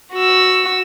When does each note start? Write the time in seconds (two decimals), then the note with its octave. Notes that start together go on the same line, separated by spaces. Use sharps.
0.15 F#4 E6